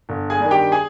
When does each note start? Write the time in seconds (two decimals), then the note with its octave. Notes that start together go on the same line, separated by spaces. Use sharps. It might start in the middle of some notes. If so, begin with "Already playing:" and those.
0.09 G1
0.30 G#4 G#5
0.40 G2 D#3
0.51 G4 G5
0.72 G#4 G#5